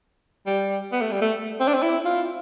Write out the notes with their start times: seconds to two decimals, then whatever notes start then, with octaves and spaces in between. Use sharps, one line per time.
0.47 G3
0.93 B3
1.01 A3
1.12 G3
1.22 A3
1.60 C4
1.68 D4
1.74 C4
1.82 E4
2.05 F4